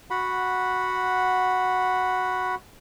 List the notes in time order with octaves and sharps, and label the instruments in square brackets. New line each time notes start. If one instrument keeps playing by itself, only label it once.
[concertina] F#4 F#5 B5